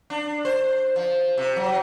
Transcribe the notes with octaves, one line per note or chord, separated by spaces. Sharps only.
D4
C5
F3
C3
F#3